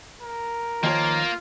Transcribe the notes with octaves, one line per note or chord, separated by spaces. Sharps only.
A#4
D#3 F3 A#3 F4 C#5